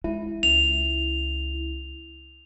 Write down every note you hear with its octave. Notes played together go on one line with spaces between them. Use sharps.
G#3 E4
C#2 F7